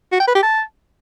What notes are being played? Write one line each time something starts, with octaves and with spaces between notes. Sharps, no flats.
F#4
G5
B4
G4
A5